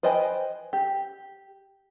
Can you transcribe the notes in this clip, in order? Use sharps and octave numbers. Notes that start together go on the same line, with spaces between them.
B4 C5 D#5 G5 G#5
G4